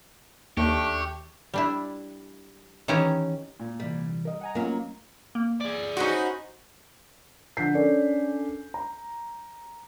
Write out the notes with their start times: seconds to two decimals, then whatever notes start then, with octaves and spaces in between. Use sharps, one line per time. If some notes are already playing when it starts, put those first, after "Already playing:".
0.57 D#2 A3 D4 G4 C#6
1.54 G3 D4 E4
2.88 D#3 E3 C#4 G4 G#5 A#5
3.60 A#2
3.80 C3 E3 G3
4.25 A#4 D#5
4.41 F#5 G#5 A#5
4.55 F#3 A#3 B3 C#4 F4
5.35 A#3
5.60 G#4 D5
5.97 C#4 D#4 F#4 B4 C5
7.57 D3 F3 G6 B6 C7
7.74 C#4 D4 A4 A#4 D5
8.74 A#5